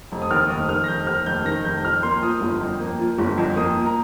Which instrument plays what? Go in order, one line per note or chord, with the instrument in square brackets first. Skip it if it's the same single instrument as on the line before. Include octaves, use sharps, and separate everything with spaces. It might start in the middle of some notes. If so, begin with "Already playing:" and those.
[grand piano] F1
D#6
D#2 F6
F1 D#6
D#3 F6
A#6
F1 G6
D#2 F6
F1 G6
D#3 A#6
F1 G6
F2 F6
A#3 C6
F3 D#6
G1
F2
A#3
F3
G1
F2
A#3 D#6
F3
A#5